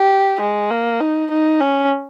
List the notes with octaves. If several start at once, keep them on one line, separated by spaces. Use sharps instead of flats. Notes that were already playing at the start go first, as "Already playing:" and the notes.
Already playing: G4
G#3
A#3
D#4
D#4
C#4